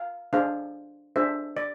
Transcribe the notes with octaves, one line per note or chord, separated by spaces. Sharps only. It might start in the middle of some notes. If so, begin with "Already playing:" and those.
Already playing: F5
D4 G#4 C5 F5
D4 G#4 C5 E5
D5